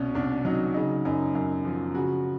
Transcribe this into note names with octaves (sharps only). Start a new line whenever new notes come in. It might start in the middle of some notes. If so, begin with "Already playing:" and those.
Already playing: C2 B2 C#4
C2 D4
F#3 D#4
C#3 D#4
F#2 D#4
F#2
F3
C#3 F#4